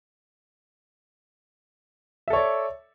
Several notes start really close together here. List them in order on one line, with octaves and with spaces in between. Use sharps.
E5 A4 C#5 D5